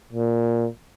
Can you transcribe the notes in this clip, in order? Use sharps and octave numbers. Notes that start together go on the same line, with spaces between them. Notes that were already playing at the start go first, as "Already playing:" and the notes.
A#2